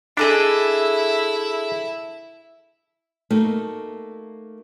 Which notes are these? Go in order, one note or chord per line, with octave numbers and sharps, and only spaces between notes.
D4 E4 G#4 A4 D#5 E5 B5
A3 A#3 D#4 F#4